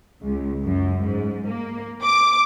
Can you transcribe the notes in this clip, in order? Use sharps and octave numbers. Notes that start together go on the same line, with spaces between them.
C#2
F#2
G#2
A#3
D6